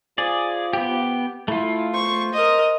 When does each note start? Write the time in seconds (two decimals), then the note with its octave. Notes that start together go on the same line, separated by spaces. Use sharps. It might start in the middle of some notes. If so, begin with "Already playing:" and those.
0.18 F3 G#4 D5
0.73 B3 G4
1.48 A3 E4 F4
1.94 C5 C#6
2.34 A#4 D#5